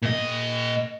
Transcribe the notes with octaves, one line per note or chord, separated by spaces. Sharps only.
A#2 D#5